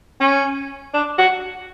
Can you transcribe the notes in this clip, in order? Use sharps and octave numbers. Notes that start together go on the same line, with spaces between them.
C#4
D4
F#4